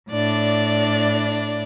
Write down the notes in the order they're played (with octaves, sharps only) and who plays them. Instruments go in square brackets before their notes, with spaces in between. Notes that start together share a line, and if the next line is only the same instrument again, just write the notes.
[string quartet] A2 D4 D5